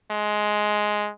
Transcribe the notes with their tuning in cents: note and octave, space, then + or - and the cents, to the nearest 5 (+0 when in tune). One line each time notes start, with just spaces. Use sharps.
G#3 +10